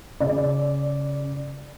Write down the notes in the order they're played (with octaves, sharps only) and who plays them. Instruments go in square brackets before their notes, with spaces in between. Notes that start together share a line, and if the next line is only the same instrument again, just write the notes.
[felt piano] C#3 [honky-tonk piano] D5